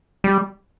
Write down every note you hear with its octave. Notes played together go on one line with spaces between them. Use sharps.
G3